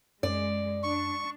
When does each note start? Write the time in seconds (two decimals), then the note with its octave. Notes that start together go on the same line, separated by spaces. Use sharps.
0.23 F#2 G#3 D5
0.83 D4 C#6